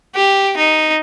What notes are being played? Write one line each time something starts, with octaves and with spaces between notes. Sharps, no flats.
G4
D#4